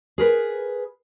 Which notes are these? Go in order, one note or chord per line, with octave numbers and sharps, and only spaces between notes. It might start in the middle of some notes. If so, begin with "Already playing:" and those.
G#4 A#4 B4